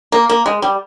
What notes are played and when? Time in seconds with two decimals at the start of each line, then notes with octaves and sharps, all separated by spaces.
0.12 A#3
0.29 A#3
0.46 G#3
0.62 G3